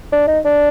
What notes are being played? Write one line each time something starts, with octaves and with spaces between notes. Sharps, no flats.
D4
D#4
D4